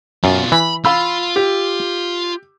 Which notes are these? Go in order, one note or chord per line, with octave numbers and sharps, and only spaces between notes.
F#2 B2 F4
E3 B5
F4 F5 B5 E6
G4